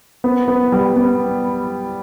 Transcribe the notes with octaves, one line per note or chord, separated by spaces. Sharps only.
B3
B3
G3
B3